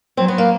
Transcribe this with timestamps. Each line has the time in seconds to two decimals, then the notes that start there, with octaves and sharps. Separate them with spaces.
0.17 F#3 C4
0.28 B3
0.38 A#3